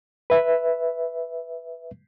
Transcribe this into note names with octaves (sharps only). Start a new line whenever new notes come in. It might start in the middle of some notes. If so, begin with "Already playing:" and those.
B4 E5